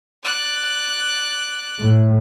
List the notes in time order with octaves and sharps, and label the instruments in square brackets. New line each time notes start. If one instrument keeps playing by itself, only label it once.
[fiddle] D5 F#6
[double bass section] A2